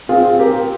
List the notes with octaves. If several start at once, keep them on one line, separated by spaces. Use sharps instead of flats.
C4 F4 G#4
G4 A#4